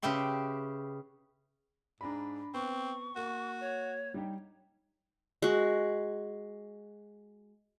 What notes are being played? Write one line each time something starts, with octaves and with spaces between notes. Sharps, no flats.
C#3 G4 B4 E5 G5 C6
G#2 D4 A#5 B5
B3 C4 C#6
A#3 F#4
C#5
G3 D#4 G4
G#3 F#4